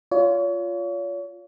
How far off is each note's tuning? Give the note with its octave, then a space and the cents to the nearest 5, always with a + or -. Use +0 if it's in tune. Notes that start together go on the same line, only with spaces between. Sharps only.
F4 +0 C#5 +35